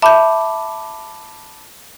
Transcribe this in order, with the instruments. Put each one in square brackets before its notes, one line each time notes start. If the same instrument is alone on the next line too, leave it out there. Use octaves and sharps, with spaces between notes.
[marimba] E5 G6 [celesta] A5 B5 D6